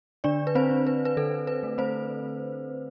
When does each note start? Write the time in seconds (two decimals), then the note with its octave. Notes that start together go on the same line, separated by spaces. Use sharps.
0.24 D3 D4 D5
0.47 B4
0.55 C4 C5
0.71 D4
0.87 B4
1.05 B4
1.17 D3 A4
1.47 B4
1.63 A3
1.78 C4 C5